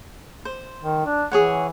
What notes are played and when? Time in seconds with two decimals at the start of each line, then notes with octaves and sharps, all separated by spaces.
0.45 C5
0.82 D#3
1.06 D4
1.32 E3 G#4 C#5 F#5